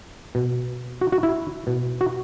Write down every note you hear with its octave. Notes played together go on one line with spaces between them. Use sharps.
B2
F#4
F#4
E4
B2
F#4